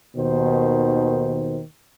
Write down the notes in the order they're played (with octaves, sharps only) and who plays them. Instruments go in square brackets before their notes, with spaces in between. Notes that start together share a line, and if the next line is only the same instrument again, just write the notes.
[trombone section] D#2 B2 D#3 C5